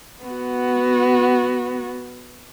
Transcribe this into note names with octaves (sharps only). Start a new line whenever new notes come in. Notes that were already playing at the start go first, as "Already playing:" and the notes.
B3 F#4